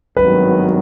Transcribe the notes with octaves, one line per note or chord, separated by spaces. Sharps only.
G#1 G2 D#3 F#3 B3 B4